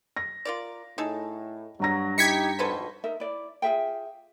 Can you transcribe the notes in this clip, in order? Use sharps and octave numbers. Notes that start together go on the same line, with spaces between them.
A#6
F4 A#4 D5
A2 D#4 G#4 A4
G2 F#3 A#5 A#6
D#4 E4 G4 G#6 B6 C#7
G#1 F2 B2 A4 B4 C5
D#4 A#4 E5
E4 D5
F4 G#4 E5 G5